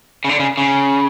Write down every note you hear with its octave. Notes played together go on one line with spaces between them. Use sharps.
C#3
D3
C#3
C#3